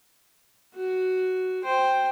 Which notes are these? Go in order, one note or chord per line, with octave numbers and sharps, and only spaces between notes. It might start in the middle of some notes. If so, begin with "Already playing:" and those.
F#4
C5 G5